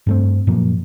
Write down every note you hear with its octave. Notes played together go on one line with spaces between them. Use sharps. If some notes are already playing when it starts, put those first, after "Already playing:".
G2 A3 C4
F#2 A#2 F3 A#3